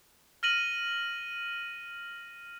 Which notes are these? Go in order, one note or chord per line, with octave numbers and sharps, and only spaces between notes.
F6 A#6 D#7 F#7